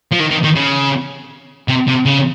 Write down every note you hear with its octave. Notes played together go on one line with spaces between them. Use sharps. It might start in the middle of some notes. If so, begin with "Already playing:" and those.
F3
D#3
D#3
D#3
C#3
C3
C3
C#3